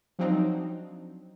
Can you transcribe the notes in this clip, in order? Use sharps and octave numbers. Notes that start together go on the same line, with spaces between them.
F3 F#3 C4 D4 D#4